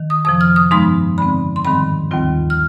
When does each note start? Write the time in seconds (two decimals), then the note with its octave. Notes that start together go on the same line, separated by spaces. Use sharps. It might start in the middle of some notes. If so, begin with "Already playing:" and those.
Already playing: D#3
0.10 D#6
0.25 F2 C3 F3 D#6
0.41 F6
0.56 D#6
0.71 G2 F3 G#3 B3 D#4 C6
1.18 D3 G#3 C4 B5
1.56 C6
1.64 G#2 D#3 G3 C4 B5
2.11 D#2 D#3 G3 C4 F4
2.50 F6